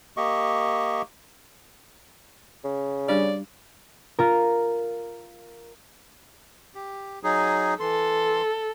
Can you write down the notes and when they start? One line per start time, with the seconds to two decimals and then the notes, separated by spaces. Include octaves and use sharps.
0.17 A#3 G4 D#5 C#6
2.64 C#3
3.08 G3 D4 G4 D5
4.19 F4 A#4
6.75 G4
7.23 F#3 D#4 G#4
7.80 E3 A4 C6